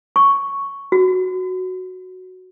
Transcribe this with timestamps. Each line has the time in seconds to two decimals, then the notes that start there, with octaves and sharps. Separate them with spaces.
0.16 C#6
0.92 F#4